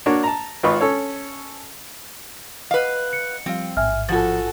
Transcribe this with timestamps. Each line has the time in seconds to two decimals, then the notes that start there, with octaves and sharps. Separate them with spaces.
0.06 A#3 D4 F#4 C#5
0.24 A5 A#5
0.63 G#1 F4 B4 D#5 B5 C#6
0.81 C#4 A4 C#5
2.71 B4 D#5 F5 F#5
3.13 C#7
3.46 F3 G3 C4 F5
3.77 A1 G#2 E5 G#5 F6
4.09 F3 F4 F#4 A4 A6